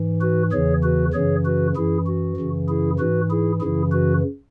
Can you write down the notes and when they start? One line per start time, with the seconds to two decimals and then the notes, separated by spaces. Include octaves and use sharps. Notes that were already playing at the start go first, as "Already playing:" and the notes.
Already playing: G#2 E3
0.21 F#4 B4
0.52 E2 C#3 E3 G#4 C#5
0.83 F#4 B4
1.14 F#2 C#3 E3 G#4 C#5
1.45 F#4 B4
1.76 F#2 E3 E4 G#4
2.06 F#4
2.37 F#2 C#3 E3
2.69 E4 G#4
2.99 G#2 E3 F#4 B4
3.30 E4 G#4
3.60 F#2 C#3 E3 E4 G#4
3.92 F#4 B4